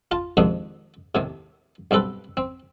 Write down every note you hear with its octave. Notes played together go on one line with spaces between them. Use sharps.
F4 A5
F2 G#2 C3 D#3 D4
D#2 A2 C3
B1 G2 C4 A4 B4
C4